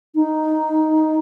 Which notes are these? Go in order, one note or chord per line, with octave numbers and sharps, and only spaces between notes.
D#4